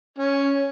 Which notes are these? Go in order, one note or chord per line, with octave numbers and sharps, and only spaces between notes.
C#4